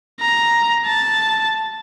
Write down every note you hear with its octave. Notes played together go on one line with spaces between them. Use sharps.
A#5
A5